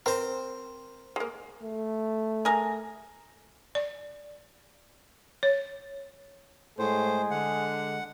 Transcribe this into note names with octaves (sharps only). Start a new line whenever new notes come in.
C4 A#4 C5
G#3 A#3
A3
G#4 A#4
D5
C#5
A2 G#3 G#4 C5
D3 F#5